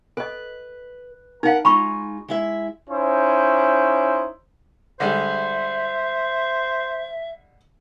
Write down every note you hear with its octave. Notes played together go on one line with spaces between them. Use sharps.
A4 B4 D#5
D#4 A#4 F5 F#5
G#3 D#4 F4 B5 C#6
G#3 E4 E5
C#4 D#4 E4 C5
D3 G3 G#3 C5 E5